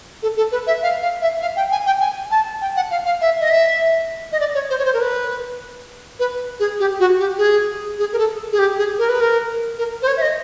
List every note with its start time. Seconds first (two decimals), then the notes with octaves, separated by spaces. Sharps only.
0.23 A4
0.37 A4
0.52 B4
0.67 E5
0.83 F5
1.02 F5
1.22 E5
1.42 F5
1.56 G5
1.72 G#5
1.86 G5
2.01 G#5
2.31 A5
2.61 G5
2.76 F#5
2.91 F5
3.06 F5
3.21 E5
3.41 D#5
3.50 E5
4.32 D#5
4.40 D5
4.55 C#5
4.70 C5
4.79 C#5
4.85 C5
4.94 A#4
5.00 B4
6.19 B4
6.60 G#4
6.80 G4
7.00 F#4
7.19 G4
7.38 G#4
7.99 G#4
8.13 A#4
8.18 A4
8.52 G#4
8.59 G4
8.78 G#4
8.99 A#4
9.09 B4
9.21 A#4
9.78 A#4
10.02 C5
10.07 C#5
10.17 E5
10.22 D#5